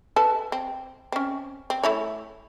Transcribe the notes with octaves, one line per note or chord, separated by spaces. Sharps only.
A4 B4 A5
C4
C4 C#4
C4
A3 E4 C#5